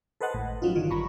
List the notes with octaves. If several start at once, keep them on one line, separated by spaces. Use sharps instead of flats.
A4 B4 C5 D#5 F#5 A5
G#1 A2
F3 F#3 C#4 D#4 F4
G2 D3 D#3 F4
G#1 G3 A#5 B5 C#6